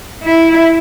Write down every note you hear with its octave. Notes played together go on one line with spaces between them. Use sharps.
E4